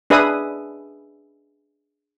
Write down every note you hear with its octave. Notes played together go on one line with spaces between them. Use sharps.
D4 G#4 B4 E5 D#6